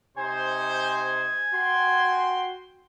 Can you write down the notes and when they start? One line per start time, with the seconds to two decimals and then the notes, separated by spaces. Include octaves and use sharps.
0.18 C3 D#4 C5 G#5
1.53 F#4 G5 C6